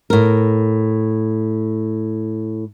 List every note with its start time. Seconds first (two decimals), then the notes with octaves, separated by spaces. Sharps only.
0.10 A2 A#4